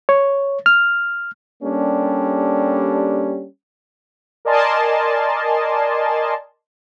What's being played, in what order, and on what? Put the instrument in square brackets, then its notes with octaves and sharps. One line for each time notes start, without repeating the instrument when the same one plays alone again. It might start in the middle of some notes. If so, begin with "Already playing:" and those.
[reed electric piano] C#5
F6
[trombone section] G3 A#3 C#4 D4 G4 A4
[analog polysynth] A#4 D5 D#5 G#5 A5 C6